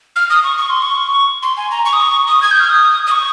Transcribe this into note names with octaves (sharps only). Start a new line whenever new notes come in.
F6
D#6
C#6
C#6
C6
C#6
C6
G#5
A#5
C#6
D#6
C#6
D#6
G#6
G6
F6
D#6
D#6
C#6